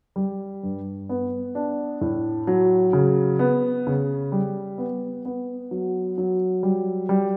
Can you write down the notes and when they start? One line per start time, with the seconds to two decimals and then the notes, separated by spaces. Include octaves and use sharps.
0.16 G3
0.63 G2
1.09 B3
1.55 D4
2.01 A2
2.47 F#3
2.93 C#3
3.39 B3
3.87 C#3
4.32 G3
4.78 B3
5.25 B3
5.71 F#3
6.18 F#3
6.63 G3
7.09 G3